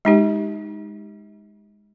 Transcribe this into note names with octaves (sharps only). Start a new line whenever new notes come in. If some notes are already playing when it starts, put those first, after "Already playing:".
G#3 D#4 G4